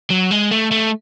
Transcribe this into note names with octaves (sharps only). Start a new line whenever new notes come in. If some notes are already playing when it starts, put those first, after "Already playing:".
F#3
G#3
A3
A3